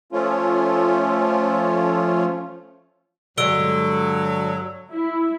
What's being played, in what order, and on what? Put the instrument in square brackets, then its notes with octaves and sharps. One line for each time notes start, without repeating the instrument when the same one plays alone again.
[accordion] F3 A3 C#4 F4
[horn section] G2 F#3 [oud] D3 G#3 [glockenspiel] E6 D7 G7
[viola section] E4